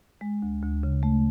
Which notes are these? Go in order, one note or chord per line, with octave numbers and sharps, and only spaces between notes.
G#3
D2
D2
C#3
A3